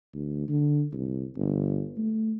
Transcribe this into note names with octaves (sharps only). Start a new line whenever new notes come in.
D2
D3
C2
G1
A3